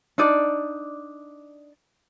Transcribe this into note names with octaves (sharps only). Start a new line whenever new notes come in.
D4 D#4 D5